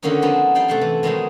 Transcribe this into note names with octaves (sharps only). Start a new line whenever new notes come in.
D3 D#3 F#3 A#3 C#4 D#4
F3 G#3 B3 C4 D4 D#4
G3 C5 F5 G5
C3 A3 D5 F#5 A5 C6
E3
B2 D#3 F#3 G#3 C4 D#4